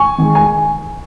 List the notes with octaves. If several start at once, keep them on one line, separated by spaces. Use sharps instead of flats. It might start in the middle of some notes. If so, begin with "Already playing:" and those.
Already playing: G#5 C#6
D#3 G#3
G#5